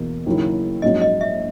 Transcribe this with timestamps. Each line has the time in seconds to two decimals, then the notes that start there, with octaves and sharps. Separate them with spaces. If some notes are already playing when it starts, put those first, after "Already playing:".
Already playing: E2 B2 A#3
0.26 D#2 C#3 F#3 A#3 E4
0.82 A#1 G#2 F#3 C#4 F#4 D#5
1.02 D#5
1.21 E5